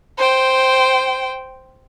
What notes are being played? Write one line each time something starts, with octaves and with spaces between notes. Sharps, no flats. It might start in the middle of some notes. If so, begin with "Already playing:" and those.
C5 G5